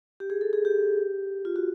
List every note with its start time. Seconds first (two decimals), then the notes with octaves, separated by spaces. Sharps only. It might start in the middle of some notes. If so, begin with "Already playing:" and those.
0.20 G4
0.30 G#4
0.41 A4
0.53 G#4
0.65 G4
1.45 F4
1.56 F#4